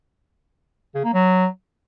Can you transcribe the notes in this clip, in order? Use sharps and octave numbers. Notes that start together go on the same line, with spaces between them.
C#3
A#3
F#3